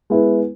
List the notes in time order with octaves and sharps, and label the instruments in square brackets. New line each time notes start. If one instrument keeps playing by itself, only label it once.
[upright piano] G#3 B3 E4 B4